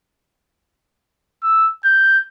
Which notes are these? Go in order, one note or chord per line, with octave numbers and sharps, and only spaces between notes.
E6
G6